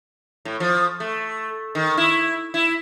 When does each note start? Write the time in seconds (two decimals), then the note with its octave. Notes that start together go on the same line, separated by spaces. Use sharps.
0.45 A2
0.60 F3
1.00 A3
1.75 D#3
1.97 E4
2.54 E4